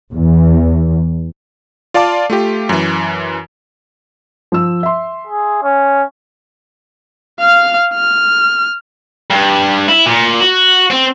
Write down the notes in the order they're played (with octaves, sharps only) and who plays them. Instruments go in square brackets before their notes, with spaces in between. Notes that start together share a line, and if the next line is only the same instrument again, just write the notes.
[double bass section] E2
[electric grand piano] F4 D5 F5 A5 D6
A3 F4 G4
F#2 E3
[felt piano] F3 E6
E5 C6
[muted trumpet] G#4
C#4
[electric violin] F5 F6
F6
[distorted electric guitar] G2
E4
A#2
F#4
C4